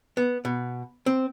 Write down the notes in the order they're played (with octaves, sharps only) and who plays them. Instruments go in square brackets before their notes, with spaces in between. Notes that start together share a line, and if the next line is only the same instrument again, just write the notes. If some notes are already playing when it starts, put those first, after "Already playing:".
[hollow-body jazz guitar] B3
B2
C4